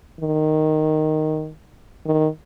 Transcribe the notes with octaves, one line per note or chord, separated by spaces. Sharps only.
D#3
D#3